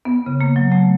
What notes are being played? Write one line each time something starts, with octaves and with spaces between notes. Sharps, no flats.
B3
C#3
A#3
F#3
A3